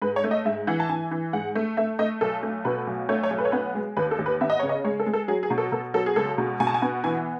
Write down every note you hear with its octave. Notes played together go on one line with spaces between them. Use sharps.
G#2 B4
C#5
A3
D#5
G#2 E5
E3 F#5
A5
E3 G#5
E3
G#2 F#5
A3
A3 E5
A3 D#5
B1 A4
A3
B2 B4
B1
A3 C#5
C#5
B1
B4
C#5
B3 B4
G#3
D#2 B4
A4
D#2
B4
B3 E5
D#5
C#3 C#5
D#5
G#3 C#5
A4
G#3
A4
F#3 G#4
G#4
B2
A4
B2 A4
F#3 A4
G#4
C#2 A4
B2
B2 G#5
A5
G#5
B3
E3 G#5